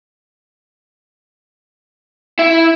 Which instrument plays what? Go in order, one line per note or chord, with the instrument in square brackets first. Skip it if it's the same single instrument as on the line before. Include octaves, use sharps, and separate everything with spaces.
[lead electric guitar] E4